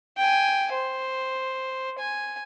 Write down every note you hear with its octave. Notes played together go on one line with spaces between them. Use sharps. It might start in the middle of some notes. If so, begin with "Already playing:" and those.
G5 G#5
C5
G#5